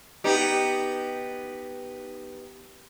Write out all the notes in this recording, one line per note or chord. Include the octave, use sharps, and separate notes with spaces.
B3 D#4 G4